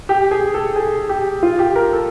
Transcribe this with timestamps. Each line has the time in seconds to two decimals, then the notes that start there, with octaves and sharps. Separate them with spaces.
0.09 G4
0.31 G#4
0.54 A4
0.76 G#4
1.09 G4
1.43 F4
1.59 G4
1.76 A#4
1.93 A4